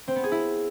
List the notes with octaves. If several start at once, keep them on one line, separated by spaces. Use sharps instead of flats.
C4
B3
G#4
E4